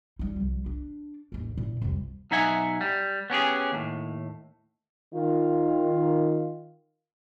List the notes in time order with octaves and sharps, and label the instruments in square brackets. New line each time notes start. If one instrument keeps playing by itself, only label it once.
[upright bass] G3 D#4
C2 F3
D4
A1 D#2
A#2 E4
C2 F2
[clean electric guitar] B1 D#4 E5 F#5 G#5
G3
B3 C#4 G4 G#4
D#2 A2
[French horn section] D#3 F4